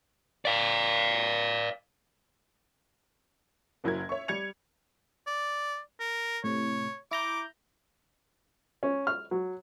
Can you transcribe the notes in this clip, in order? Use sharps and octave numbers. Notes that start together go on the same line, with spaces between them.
D5 F5
F#1 F#3 E4 A#4 G#6
C#5 E5 C#6
G3 G#6 C#7 F7
D5
A#4
A2 C3 C#5
E4 A#5 D6 G6
C#4
F6
F#3